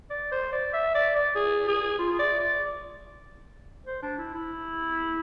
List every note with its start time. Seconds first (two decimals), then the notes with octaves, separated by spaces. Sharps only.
0.10 D5
0.32 C5
0.52 D5
0.73 E5
0.95 D5
1.16 D5
1.35 G#4
1.68 G#4
1.99 F4
2.19 D5
2.40 D5
3.87 C5
4.02 D4
4.18 E4
4.34 E4